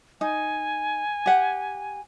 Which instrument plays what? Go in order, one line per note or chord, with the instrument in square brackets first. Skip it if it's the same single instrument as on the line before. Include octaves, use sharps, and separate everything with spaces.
[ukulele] D#4 [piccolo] G#5
[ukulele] G4 F#5